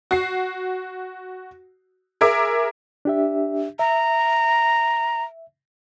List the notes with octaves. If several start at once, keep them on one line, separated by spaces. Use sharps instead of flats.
F#4 C7
G#4 A#4 E5 D6
D4 G4 E5
E5 A#5